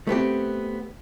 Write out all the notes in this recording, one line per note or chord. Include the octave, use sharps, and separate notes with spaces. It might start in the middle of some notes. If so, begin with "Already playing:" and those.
A3 B3 C4 G4